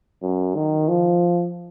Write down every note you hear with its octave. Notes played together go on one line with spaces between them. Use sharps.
F#2
D#3
F3